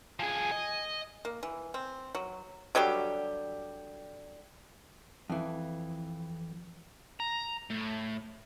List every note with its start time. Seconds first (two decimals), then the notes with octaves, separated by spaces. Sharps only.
0.20 F3 G#4 G#5
0.51 D#5
1.25 A#3
1.43 E3
1.74 C4
2.15 F#3
2.75 D3 F#3 G3 G4
5.30 F2 E3
7.20 A#5
7.70 A2 A3